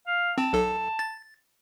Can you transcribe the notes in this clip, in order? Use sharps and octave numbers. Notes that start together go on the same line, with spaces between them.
F5
C4 A5
B1 A4
A6